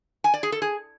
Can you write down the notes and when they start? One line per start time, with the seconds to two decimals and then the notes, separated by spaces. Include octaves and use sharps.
0.24 G#5
0.34 D5
0.43 G#4
0.52 A4
0.62 G#4